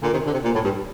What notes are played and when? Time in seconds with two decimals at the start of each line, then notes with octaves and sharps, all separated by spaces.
0.02 A#2 D3
0.13 C3 D#3
0.25 D3
0.33 C3
0.43 A#2
0.53 A2
0.64 G2